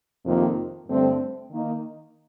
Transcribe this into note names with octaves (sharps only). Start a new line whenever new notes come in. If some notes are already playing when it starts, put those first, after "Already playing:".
F2 C3 D#3 A#3 F4
G2 D3 A3 C4
D#3 A#3 D#4